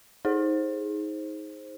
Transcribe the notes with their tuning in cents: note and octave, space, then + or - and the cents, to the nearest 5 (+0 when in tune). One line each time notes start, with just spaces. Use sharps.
D#4 +25 G#4 +0 C5 +15